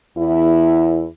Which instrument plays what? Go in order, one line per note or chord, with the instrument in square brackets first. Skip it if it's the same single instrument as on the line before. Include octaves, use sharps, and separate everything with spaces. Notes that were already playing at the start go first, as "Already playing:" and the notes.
[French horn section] E2 E4